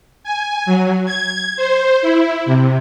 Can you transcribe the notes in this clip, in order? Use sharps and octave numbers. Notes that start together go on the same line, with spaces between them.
G#5
F#3
G#6
C5
E4
C3